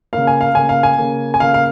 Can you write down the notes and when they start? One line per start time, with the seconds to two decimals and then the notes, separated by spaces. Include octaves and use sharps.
0.13 C#3 A#3 F5
0.27 G#5
0.41 F5
0.55 C#3 A#3 G#5
0.69 F5
0.83 G#5
0.98 C#3 A#3
1.34 G#5
1.40 C#3 A#3 F5
1.54 F5